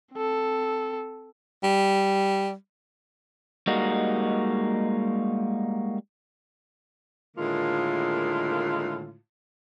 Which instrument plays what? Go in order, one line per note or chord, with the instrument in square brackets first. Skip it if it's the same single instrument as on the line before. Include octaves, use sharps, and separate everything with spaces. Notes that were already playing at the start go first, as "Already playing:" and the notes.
[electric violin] C4 A4
[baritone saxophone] G3
[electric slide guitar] G3 G#3 A#3 D#4 F#4
[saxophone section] A2 D3 D#3 G#3 A#3 F4